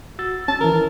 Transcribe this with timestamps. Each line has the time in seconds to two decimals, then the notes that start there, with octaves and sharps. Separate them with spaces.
0.19 F#4 E6 A6
0.48 C#4 A5
0.61 D#3 E3 A#4